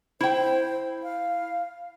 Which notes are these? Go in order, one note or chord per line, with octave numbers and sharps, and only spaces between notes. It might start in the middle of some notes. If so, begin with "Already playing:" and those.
E4 C5 G5
F5